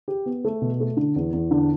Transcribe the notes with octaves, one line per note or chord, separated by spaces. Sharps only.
G4
B3
A3
B2
A3
D3
E2
E2
D3